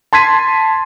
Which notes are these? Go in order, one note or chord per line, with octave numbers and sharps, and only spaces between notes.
A5 C6 G#6 B6 D#7